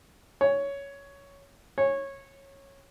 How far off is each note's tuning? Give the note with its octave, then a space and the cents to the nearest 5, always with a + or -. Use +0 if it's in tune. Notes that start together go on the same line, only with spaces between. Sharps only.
C#5 +10
C#5 -15